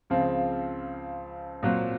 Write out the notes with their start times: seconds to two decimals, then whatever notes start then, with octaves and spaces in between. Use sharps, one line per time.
0.10 C#2 C#3 F3 C4 F4
1.63 A#2 F#3 C4